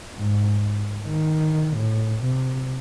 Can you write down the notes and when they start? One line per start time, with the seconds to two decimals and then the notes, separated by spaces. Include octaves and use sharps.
0.15 G#2
1.06 D#3
1.76 A2
2.23 C3